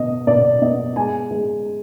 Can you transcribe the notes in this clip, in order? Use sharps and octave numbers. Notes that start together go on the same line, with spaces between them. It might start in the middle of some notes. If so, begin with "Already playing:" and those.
Already playing: B2 B3 D#5
B2 D5
B3 D#5
G#3 G#5
G#3